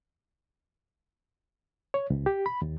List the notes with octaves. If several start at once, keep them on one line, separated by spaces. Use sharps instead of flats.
C#5
C#2
G4
B5
D#2